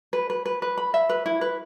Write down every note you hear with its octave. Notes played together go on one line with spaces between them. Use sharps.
B4
B4
B4
B4
B5
E5
B4
E4
B4